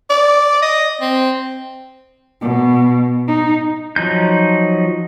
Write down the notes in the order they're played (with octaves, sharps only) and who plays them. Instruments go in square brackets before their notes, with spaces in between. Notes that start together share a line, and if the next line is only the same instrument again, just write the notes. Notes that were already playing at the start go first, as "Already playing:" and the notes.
[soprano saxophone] D5
D#5
C4
[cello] B2
D#4
[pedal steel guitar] F3 F#3 D#4 G6